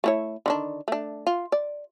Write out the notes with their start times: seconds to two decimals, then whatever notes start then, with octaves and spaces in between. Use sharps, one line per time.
0.04 A3 E4 C#5
0.46 D3 D#3 D4
0.88 A3 D4
1.27 F4
1.52 D5